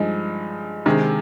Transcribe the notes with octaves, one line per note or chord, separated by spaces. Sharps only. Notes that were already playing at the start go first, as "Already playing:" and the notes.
Already playing: G2 F3 G#3 D#4
C3 D#3 G#3